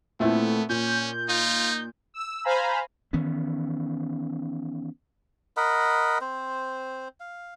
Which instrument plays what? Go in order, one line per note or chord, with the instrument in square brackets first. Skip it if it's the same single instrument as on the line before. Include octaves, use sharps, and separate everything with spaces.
[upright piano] A#2 C4 E4 [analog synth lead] A3 [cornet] B3
[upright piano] A#2 [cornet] C#4 [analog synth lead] G6
[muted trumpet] D#4 [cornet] F4
[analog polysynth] E6
C5 F5 G#5 A#5 B5
[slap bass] D#3 E3 B3 C#4
[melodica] A#4 D#5 F#5 B5
C4 C5
F5